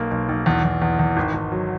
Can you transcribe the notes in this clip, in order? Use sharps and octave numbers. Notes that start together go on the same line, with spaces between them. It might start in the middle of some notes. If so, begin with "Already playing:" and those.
Already playing: B1 A#3
B1
B1
E2
E2
E2
E2
G#1
G#1
F#3